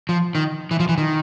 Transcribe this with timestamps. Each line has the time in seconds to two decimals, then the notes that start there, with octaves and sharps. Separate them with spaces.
0.09 F3
0.35 D#3
0.71 E3
0.80 F3
0.89 E3
0.98 D#3